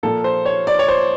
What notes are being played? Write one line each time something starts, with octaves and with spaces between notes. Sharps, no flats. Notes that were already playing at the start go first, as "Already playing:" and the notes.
A#2 F3 A#3 A4
C5
C#5
D5
C#5
C5